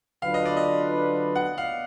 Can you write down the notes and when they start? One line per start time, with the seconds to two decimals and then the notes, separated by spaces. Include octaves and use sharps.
0.22 D3 F#3 D4 F4 B4 F5
0.34 D#5
0.46 D5
0.57 D#5
1.35 F#5
1.58 F5